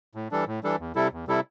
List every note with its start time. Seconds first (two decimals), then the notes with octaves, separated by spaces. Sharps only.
0.15 A2
0.31 E3 G3 D4 A4
0.47 A2
0.63 E3 G3 D4 A4
0.79 E2
0.95 C3 G3 E4 A4
1.12 E2
1.28 C3 G3 E4 A4